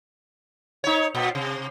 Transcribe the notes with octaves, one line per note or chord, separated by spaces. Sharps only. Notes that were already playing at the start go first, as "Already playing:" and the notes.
D#4 C#5
A#2
C3